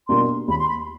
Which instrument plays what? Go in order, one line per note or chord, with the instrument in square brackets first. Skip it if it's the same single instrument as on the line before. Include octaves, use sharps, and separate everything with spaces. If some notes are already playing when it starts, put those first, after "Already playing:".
[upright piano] B2 G3 A#3 D4 [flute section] C6
[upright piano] D#2 [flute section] B5
[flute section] C6
B5